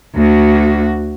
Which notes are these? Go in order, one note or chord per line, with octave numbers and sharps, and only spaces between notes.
D2 F#4